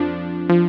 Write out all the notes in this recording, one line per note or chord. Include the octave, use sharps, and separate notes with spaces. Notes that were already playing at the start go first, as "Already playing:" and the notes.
Already playing: F2 F3 D4
F3